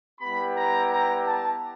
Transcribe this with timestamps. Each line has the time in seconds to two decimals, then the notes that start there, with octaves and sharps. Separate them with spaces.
0.20 G3 B3 E4 G4 B5
0.55 A#5
0.89 A#5
1.24 A5